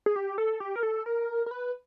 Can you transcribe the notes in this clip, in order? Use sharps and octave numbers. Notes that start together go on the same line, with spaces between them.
G#4
G4
A4
G4
A#4
A4
A#4
A#4
B4